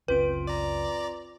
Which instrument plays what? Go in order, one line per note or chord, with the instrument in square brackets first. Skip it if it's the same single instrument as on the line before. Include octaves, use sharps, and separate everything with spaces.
[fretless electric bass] F#1 C#2 C#4 [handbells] C4 F4 D7 [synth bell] B4
[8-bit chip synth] D5 A#5